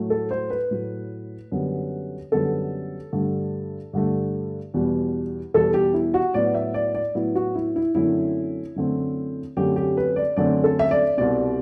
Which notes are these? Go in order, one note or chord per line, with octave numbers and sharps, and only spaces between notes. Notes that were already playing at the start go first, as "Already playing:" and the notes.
Already playing: A2 F#3 A3
A4
C5
B4
A2 F#3 A3
F#2 D3 G3 B3
F#2 D3 G3 B3 A4
G2 D3 A3
G2 D3 A3
E2 B2 G3
E2 B2 G3 A4
G4
E4
F#4
A2 F#3 B3 D5
E5
D5
D5
A2 F#3 B3 E4
F#4
E4
E4
F#2 D3 A3 C4 E4
F#2 D3 A3 C4
F#2 D3 A3 C4 G4
G4
B4
D5
F#2 D3 A3 C4 D5
A4
E5
D5
C2 B2 G3 C4 D5